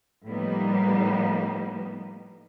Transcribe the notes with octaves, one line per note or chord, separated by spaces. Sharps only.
A2 F3 G3 A#3 B3 D#4